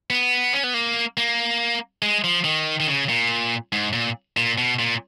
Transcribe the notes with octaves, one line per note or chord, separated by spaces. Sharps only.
B3
C#4
B3
A#3
A#3
G#3
F3
D#3
D#3
C#3
A#2
G#2
A#2
A#2
B2
A#2